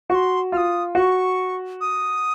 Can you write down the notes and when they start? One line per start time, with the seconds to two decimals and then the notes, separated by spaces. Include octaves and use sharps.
0.10 F#4 C#6
0.15 C6
0.52 F4 F6
0.57 D#6
0.95 F#4 C#6
1.81 D#6